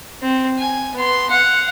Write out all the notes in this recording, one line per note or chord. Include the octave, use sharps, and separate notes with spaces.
C4
G#5
B3 C6
F5 F#5